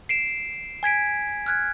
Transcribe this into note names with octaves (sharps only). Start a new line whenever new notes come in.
C7 D7 E7
G#5 G#6 B6 D7
F6 F#6 G#6